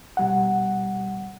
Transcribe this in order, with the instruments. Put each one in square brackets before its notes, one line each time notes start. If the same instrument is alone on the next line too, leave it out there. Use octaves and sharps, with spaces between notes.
[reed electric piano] B2 G3 F#5